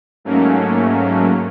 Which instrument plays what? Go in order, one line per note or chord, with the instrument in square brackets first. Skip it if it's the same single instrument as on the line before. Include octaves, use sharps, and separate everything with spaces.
[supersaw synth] G#2 F#3 A3 A#3 C#4